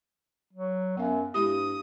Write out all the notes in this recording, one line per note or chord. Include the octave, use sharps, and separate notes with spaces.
F#3
F#2 B3 F5
G2 G#3 E4 G4 D#6